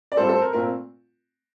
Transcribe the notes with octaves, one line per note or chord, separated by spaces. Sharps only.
D5
A2 G3 C4 F4 A4 C5
A4 C5
A#4
A#2 A3 C4 F4 A#4